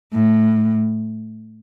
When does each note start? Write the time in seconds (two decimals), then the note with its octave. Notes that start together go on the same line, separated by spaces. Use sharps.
0.13 A2